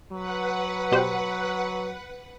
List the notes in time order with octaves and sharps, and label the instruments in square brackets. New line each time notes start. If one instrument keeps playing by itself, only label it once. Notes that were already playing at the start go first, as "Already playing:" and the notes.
[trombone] F#3 [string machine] B4 F#5
[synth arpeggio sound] B2 G4 C5